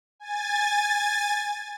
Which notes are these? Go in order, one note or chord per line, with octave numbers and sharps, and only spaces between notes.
G#5 A6